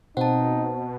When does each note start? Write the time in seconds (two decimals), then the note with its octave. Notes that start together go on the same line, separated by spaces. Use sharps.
0.17 B2 C4 D#4 F#5 A5